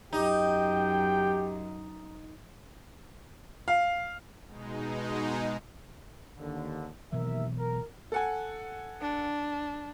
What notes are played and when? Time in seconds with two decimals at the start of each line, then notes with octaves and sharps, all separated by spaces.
0.13 F#2 D#4 G4 G5
3.68 F5
4.46 B2 G#3 D#4
6.39 D#2 D3
7.12 D#2 B2 E3 F#3 A#4 E5
7.58 A#4
8.12 A4 F#5 G#5
9.01 D4